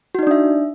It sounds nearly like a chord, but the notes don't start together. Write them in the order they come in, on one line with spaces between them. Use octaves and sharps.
F#4 D#4 D5 D4 E5